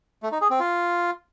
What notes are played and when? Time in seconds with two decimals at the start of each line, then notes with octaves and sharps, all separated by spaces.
0.23 A3
0.32 D#4
0.41 G#4
0.51 C4
0.60 F4